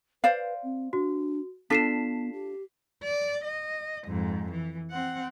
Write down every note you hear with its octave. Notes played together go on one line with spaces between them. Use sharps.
B4 C5 D5 F5
C4
D4 F#4
B3 D4 F4 A4 B6 C7 E7
G4
D5
D#5
F2 G#2
E3
C4 F#5